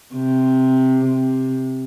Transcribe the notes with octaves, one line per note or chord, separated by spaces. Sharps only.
C3
C3